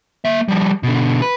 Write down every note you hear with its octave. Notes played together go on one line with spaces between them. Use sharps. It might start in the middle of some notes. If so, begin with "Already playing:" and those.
A#3 E5
F3 G3
B2 D3
B4